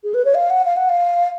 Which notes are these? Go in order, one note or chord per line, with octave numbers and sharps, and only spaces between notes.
G#4
B4
C#5
F5
F#5
F5
F#5
F5